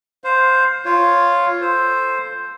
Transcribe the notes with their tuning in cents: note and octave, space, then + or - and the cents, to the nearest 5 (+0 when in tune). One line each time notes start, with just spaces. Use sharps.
C5 +0 F5 +25
F4 +0 C#5 +0
A4 +0 C5 +0